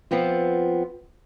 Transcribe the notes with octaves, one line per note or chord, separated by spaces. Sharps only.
F3 B3 C4 F4